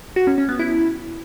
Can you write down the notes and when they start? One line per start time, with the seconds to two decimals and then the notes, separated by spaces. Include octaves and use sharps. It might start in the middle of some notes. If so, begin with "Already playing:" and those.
0.16 F#4
0.27 C#4
0.38 C#4
0.49 B3
0.59 E4